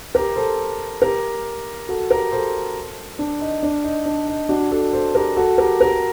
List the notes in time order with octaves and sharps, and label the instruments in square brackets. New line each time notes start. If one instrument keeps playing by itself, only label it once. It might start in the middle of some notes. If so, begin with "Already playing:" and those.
[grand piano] G4 A#4
A4 C5
G4 A#4
F#4 A4
G4 A#4
A4 C5
D4
D#4
D4
D#4
D4
D#4
D4 F#4
F#4 A4
A4 C5
G4 A#4
F#4 A4
G4 A#4
G4 A#4